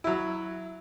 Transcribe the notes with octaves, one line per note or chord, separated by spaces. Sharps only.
F#3 E4